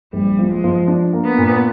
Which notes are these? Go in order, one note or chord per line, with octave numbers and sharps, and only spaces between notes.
A#1 G3
F3
G#3
F3
D4
A#3
B3
A#2